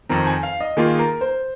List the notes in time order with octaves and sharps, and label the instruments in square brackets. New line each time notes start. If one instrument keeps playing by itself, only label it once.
[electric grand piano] F2 D#3 C4 [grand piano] A#5
[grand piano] G#5
F5
D#5
[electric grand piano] D#3 A#3 F4 [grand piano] G#4
[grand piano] A#4
C5